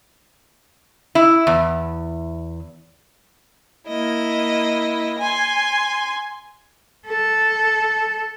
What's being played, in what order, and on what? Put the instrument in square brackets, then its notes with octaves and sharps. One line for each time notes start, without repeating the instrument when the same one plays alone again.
[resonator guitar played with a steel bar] E4
E2
[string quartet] A#3 E4 D#5
G#5 C6
[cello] A4